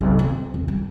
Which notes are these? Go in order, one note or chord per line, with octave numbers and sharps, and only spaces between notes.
B1
C4
E2
G3